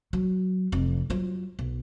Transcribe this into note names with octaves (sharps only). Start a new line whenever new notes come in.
F#3
F1 F2
F#3 F4
B1